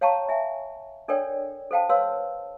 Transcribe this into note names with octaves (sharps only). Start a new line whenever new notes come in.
C#5 F5 G5 A5 A#5 C#6
E5 G#5
D4 A4 A#4 C#5 D5 G5
A4 C5 F5 G5 A5
B4 C#5 F5 C6 E6